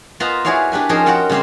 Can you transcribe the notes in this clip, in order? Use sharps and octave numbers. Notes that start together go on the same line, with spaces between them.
B3 F4 B4 C5 D#5 A#5
E4 F#4 G#4 C#5 D5 F5
D4 G4 B4 G#5
F3 C#4 D#4 G#4 A#4 C5
F#4 A#4 F#5 G5 A5
C#3 G3 C4 G4 C5